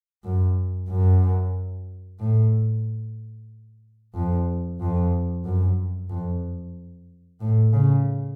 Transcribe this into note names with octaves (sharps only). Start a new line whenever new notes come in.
F#2
F#2
A2
F2
F2
F#2
F2
A2
C#3